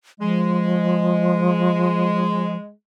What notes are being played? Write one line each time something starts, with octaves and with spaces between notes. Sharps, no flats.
F3 G#3